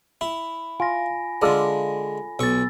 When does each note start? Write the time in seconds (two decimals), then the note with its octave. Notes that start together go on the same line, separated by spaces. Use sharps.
0.21 E4 B5
0.80 F4 G#5 A#6
1.42 D3 G#3 F4 A4 D5
2.39 B1 C#6 E6 A6